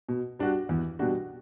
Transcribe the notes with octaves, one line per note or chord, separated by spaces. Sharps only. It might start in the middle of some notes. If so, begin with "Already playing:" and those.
B2
G3 D4 F#4
E2
B2 G3 D4 F#4